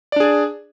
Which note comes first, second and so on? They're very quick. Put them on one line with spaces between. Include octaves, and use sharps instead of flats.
D5 D4 G#4